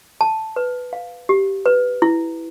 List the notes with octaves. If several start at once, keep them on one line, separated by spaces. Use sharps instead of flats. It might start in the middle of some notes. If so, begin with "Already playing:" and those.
A5
B4
F5
G4
B4
E4